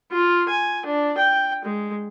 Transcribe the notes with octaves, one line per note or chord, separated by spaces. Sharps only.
F4
G#5
D4
G5
G#3